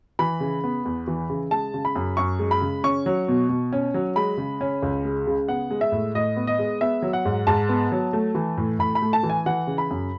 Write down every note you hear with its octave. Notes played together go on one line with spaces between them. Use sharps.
E3 B5
C#3
B3
E2
E3
C#3
G#3 A5
C#3
B5
F#2
F#2 C#6
G#3
B5
C#3
C#4 C#6
F#3
B2
B2
C#4
F#3
G#3 B5
C#3
C#4
C#2
G#3
C#3
B3 F#5
G#3
E5
A2
A2 D#5
B3
D#5
G#3
B3 E5
F#3
F#5
G#2
G#2 A5
B3
F#3
A3
E3
A2
A2 B5
B5
A3
A5
E3
G#5
E3 F#5
C#3
B5
F#2